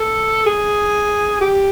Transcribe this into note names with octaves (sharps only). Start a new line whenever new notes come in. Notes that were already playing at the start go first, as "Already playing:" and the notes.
Already playing: A4
G#4
G4